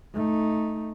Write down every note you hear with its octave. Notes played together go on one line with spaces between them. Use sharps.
A3 D#4